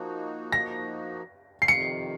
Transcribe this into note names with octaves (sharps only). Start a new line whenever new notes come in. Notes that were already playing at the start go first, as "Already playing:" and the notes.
Already playing: F3 A#3 D#4 F#4
A#6
C7
F2 C3 D#3 C#7